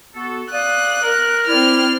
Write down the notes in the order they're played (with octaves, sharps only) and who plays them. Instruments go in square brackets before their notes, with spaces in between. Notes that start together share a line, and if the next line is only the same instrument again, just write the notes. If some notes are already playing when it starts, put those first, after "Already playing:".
[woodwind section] B3 F#4 A4
[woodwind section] D5 F5 D#6 [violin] F#6
[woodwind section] A#4
[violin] C4 F6 [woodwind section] E4 D5